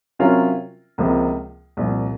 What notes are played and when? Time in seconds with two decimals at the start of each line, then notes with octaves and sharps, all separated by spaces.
0.19 C3 F#3 C#4 F4 A#4
0.98 C#2 C3 F3 A#3
1.77 C2 A#2 F3